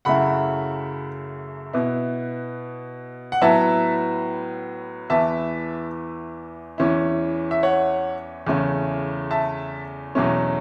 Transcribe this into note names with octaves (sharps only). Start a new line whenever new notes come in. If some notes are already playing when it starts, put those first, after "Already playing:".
F#2 C#3 F#3 A3 E4 F#5 B5
B2 B3 E4
F#5
A2 F#3 B3 E4 E5 A5
E2 E3 B3 E4 E5 A5
E2 E3 C#4 E4
E5
C#5 F#5
E2 C#3 A3 C#4 E4
E5 A5
E2 B2 F#3 A3 C#4